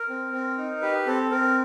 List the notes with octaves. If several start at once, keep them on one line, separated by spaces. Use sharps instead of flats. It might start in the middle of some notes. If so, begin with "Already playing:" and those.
Already playing: A#4
C4
C4
D#4
G4 B4
C4 A4
C4 A#4